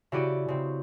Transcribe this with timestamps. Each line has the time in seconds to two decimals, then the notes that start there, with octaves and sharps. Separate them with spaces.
0.12 C#3 E4 F#4 G4 D5 D#7
0.48 C#3 C4